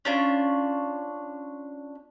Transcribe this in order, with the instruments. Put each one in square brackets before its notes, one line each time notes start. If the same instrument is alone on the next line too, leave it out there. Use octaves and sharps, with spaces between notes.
[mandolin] C#4 D4 F4